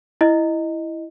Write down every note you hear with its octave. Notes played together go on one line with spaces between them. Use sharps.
E4 D#5